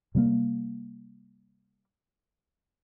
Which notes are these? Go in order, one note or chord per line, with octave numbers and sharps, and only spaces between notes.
C3 G3 A3 A#3